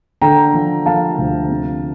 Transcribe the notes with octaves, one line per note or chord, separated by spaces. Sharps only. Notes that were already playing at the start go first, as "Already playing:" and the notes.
D3 G5 A#5
F3
F3 F5 A5
D2
C3